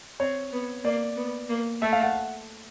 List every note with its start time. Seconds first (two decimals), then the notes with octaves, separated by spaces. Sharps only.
0.20 C4 C#5
0.52 B3
0.84 A#3 D5
1.16 B3
1.49 A#3
1.81 A3 E5
1.93 F5
2.03 F#5